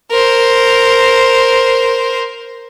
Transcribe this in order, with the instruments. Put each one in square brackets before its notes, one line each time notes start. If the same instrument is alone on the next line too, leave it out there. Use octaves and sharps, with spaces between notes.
[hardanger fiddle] A#4 C5